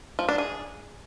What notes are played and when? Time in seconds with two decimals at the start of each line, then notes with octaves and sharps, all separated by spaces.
0.19 F3
0.29 D4
0.38 G#4